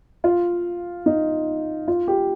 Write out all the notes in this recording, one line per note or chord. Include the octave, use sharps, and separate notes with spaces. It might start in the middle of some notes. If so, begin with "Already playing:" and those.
F4
D#4
F4
G4